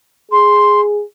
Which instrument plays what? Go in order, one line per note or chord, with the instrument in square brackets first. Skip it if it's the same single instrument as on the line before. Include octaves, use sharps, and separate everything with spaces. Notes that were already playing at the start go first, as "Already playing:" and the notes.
[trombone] G#4 [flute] C6